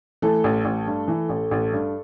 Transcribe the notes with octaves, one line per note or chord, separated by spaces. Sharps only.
E3 A3 A4
A1
A1
G2
E3
A1
A1
G2